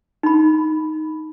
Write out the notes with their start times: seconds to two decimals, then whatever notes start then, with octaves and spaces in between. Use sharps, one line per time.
0.23 D#4 B5